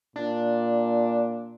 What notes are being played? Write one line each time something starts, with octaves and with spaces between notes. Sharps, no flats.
A#2 D4